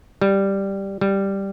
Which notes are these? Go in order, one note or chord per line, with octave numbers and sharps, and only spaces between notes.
G3
G3